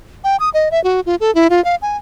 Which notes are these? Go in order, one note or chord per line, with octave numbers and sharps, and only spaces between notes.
G5
D#6
D#5
E5
F#4
F4
A4
E4
F4
F5
G#5